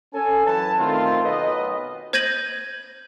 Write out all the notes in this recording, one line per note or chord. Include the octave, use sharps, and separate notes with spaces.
C#4 A4 G#5
F#2 E3 B4 A5
D#3 A3 C4 F4
B1 B4 D#5
C5 G6 G#6 A#6 D#7 F#7